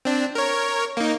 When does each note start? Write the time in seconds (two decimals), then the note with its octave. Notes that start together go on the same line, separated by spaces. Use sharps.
0.05 C4 D4
0.35 A#4 C#5
0.97 A#3 D#4